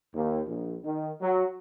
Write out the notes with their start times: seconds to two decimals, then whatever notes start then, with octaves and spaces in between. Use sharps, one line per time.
0.14 D#2
0.47 A#1
0.84 D#3
1.21 F#3